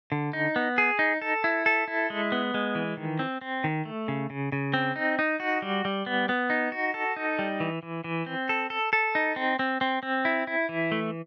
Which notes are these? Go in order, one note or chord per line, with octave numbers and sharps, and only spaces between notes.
D3
D#4
B3
G#4
D#4
A4
E4
A4
E4
G#3
B3
G#3
E3
D#3
C4
C4
D#3
A3
C#3
C#3
C#3
C4
D#4
D#4
F#4
G3
G3
B3
B3
D#4
F#4
A4
D#4
G3
E3
E3
E3
C4
A4
A4
A4
D#4
C4
C4
C4
C4
E4
E4
E3
A3